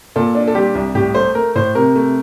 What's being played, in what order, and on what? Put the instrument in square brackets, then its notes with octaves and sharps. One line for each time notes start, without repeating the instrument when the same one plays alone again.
[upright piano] A#2 A4
D4
A4
G3 G4
C2
A2 G4
A3 C5
A3 A#4
A2 C5
C3 A#4
A3